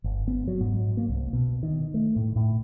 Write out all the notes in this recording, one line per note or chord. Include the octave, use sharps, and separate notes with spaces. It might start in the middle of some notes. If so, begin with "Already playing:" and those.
G1
B3
F#3
G#2
A#3
C2
B2
D#3
A3
A2
A2